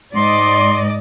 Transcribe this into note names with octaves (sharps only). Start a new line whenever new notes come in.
G#2 D5 D#5 C6